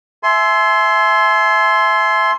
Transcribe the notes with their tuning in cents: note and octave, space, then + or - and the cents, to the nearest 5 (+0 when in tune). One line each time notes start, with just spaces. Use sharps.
E5 +0 G#5 +40 C6 +0